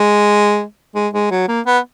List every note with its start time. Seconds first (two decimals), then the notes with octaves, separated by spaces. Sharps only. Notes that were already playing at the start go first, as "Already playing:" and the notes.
Already playing: G#3
0.95 G#3
1.13 G#3
1.31 F#3
1.48 A#3
1.66 B3